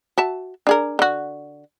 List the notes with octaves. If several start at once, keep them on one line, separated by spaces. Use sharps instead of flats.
F#4 E5 A5
D4 G#4 A#4
D3 F#4